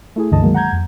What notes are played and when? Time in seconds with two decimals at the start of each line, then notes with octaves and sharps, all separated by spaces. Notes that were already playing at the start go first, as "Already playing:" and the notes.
0.16 A3 E4 G#4
0.31 C#2 G2 D3 E3 D#5 A5
0.42 D#3 F#3 G#3 A#3
0.54 F#5 A#5 G6 G#6
0.72 F2